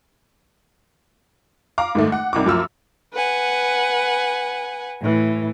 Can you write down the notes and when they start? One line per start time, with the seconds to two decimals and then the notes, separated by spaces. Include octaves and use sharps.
1.78 F5 A#5 D6
1.95 G#2 D#3 A3
2.12 F#5
2.33 C2 D#4 D6
2.46 F#2 F3 E6 F6
3.13 B4 F#5 G#5
5.00 A2 E3